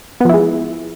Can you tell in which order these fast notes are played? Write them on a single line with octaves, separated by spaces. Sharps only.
B3 F3 E4 G#3